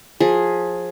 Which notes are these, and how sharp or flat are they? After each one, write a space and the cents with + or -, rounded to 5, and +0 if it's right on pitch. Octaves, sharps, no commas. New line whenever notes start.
F3 +25 G#4 +5